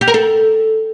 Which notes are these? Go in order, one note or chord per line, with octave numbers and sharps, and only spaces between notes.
G4
A#4
A4